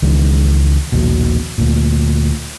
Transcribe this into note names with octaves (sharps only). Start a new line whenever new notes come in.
C#2 D#3 E3 G#3
A#1 D#2 B2
D2 A#2